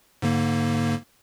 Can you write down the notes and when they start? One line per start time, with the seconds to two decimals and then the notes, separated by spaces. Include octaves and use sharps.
0.22 G#2 D3 A#3